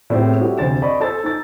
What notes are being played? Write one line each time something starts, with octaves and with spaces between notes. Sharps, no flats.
A2 B3 C4 G4 G#4
G3 E4 F#4 G4 A4
F1 D2 C5 A6 E7
D5 D#5 B5 C#6
A4 C5 G#5 A5 E6 A6
D#4 A6